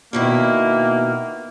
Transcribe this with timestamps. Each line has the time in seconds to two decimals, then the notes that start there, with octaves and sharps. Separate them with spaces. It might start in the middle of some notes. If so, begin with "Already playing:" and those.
0.13 B2 D#3 A#3 E4